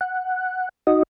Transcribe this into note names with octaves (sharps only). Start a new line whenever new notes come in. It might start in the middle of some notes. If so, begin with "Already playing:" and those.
F#5
D#4 F#4 D#5